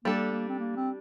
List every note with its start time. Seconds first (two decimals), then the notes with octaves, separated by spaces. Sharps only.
0.05 G3 A#3 D4 A4
0.32 A#3
0.49 C4
0.59 A#3
0.76 C4